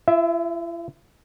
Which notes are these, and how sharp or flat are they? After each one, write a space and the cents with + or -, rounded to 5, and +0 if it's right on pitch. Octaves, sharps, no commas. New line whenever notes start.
E4 +45 E5 +0